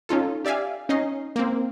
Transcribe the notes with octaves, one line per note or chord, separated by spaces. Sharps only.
C#4 D#4 F4 A4
G4 D5 E5 F5 G#5
C#4 D#4 D#5 C7
A#3 C4